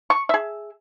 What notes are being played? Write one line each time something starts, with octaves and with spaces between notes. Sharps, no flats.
C#6
G#4 E5